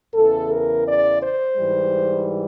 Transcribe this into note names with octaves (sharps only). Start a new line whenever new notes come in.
E2 C#3 E3 A4
A#4
D5
C5
G#2 E3 G3